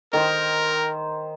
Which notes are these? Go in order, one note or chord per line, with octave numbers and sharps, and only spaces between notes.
D#3 A#4 C5